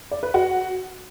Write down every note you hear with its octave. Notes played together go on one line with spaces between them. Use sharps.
D5
B4
F#4